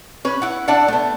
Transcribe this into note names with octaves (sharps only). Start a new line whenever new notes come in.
C#4 B4
E4 F#5
D4 D5 E5 F#5
A3 B3